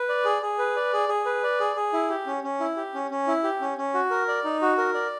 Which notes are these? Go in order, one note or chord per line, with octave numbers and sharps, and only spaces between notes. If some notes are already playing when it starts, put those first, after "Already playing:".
Already playing: B4
D5
G#4
G#4
B4
D5
G#4
G#4
B4
D5
G#4
G#4
E4
G4
C#4
C#4
E4
G4
C#4
C#4
E4
G4
C#4
C#4
F#4
A#4
D5
D#4
F#4
A#4
D5